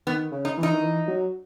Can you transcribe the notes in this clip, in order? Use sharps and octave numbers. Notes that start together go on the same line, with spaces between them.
D#3 B3
C#3
D#4
E3
D#4
D#3
E3
F#3